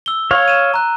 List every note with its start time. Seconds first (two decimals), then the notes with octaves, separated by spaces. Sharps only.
0.06 E6 G7
0.31 C#5 F5
0.48 D#7 E7
0.74 A#5 F#6